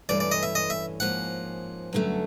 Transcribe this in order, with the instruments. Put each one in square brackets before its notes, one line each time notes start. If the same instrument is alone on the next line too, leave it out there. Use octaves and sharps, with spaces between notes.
[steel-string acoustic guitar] G2 E3 A3 C#4 [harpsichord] D5
[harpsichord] D5
D#5
E5
D#5
E5
[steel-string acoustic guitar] G#2 F3 A#3 C#4 [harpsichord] F#5
[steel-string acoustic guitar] G2 D3 F#3 A3 C#4